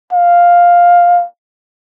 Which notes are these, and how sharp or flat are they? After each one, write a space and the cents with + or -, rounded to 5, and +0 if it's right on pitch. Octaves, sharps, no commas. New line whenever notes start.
F5 +5